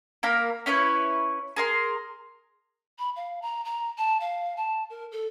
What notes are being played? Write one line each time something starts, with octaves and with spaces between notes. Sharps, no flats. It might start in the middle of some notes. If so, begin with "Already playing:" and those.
A#3 A#4 F5 B5
C#4 E4 B4 C#5
G#4 A#4 C6
B5
F5
A#5
A#5
A5
F5
A5
A#4
A4